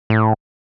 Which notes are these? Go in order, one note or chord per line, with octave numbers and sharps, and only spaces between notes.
A2